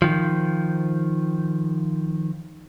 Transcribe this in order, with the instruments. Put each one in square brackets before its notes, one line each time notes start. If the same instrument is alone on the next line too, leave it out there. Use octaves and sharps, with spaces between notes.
[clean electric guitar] D#3 F3